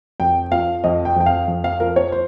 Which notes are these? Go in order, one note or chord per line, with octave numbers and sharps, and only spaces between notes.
F2 G5
F3 F5
F2 D#5
G5
F2 G5
F5
F2
F5
F3 A#4
C#5
C5